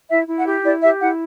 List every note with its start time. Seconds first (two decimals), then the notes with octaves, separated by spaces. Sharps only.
0.09 E4 E5
0.27 E4
0.37 F#5
0.46 G4
0.64 E4 D5
0.82 G4 E5
1.01 E4 F#5